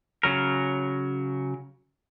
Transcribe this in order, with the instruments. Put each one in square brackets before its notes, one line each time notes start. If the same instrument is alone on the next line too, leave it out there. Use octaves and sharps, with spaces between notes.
[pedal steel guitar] C#3 F#3 A#4